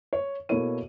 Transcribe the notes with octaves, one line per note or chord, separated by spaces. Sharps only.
C#5
B2 A#3 E4 A4 C#5 D#7